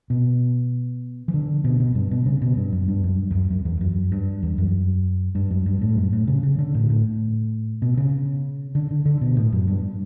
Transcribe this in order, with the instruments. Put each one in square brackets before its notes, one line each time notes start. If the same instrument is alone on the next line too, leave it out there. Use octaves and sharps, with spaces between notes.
[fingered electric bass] B2
E3
D3
B2
B2
G2
B2
C#3
B2
G2
F#2
G2
F#2
E2
F#2
F#2
E2
F#2
G2
E2
F#2
G2
F#2
G2
A2
F#2
A2
C#3
C#3
D3
A2
A2
B2
C#3
D3
D3
D3
B2
A2
F#2
G2